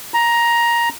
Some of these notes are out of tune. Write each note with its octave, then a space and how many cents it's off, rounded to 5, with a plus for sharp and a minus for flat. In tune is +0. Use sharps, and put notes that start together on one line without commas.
A#5 +10